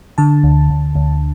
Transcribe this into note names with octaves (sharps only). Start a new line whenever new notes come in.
D3 A5
D2
D2
D2